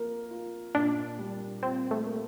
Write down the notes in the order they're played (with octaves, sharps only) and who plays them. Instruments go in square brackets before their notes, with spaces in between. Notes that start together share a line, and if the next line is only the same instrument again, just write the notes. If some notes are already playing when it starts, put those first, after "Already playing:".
Already playing: [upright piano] F3 A#3 A#4
F4
[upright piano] A#2 [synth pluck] D4
[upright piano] G3
[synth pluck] C4 [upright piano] F4
[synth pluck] A3
[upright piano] A#3